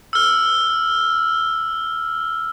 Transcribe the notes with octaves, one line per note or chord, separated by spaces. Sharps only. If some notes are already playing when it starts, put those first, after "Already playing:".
E6 F6